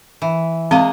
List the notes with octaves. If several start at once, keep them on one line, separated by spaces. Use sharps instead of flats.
E3
G#3 A#3 C4 D#5 F5